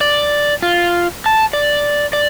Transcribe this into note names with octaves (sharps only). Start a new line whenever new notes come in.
D5
F4
A5
D5
D5